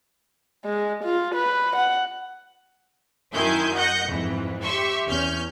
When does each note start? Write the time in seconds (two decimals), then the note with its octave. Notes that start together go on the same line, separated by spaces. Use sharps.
0.65 G#3
1.04 F4
1.35 B4
1.76 F#5
3.33 F#2 D#3 E4 G#5 C6 G6
3.75 D#5 F#5 G6 A#6 C#7
4.07 F2 G#2 E3
4.63 G4 E5 C6 C#6
5.07 E2 C#4 F6 G6